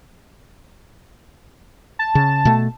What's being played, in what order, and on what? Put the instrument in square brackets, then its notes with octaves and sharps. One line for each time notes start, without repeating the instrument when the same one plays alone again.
[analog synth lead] A5
[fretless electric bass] C#3
B2 A3